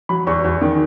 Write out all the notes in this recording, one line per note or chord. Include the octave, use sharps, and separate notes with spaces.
F#3 B5
E2 C#6
E2
D#3